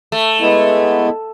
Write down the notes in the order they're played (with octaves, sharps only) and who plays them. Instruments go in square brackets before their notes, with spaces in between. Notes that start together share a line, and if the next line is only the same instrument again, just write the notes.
[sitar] A3
[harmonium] G#3 B3 E4